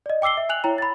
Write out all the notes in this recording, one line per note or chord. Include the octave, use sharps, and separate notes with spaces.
D5 D#5
G5 D6 E6 C7 G7
E5
G#5 F#6 F7 F#7
E4 C#5 G5 A#5
B5 A6